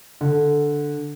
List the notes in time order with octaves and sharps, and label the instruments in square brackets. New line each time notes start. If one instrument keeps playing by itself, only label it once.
[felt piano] D3